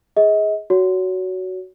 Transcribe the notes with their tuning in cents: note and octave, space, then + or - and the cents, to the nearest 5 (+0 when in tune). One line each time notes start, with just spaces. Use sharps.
G#4 +0 D#5 +35
F#4 +10 C#5 +25